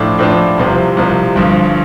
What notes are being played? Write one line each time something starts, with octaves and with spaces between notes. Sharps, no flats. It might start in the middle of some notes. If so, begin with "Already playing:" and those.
Already playing: A2 F3 D4
A2 F3 D4
C2 C3 F3
C2 C3 F3
G1 G2 F3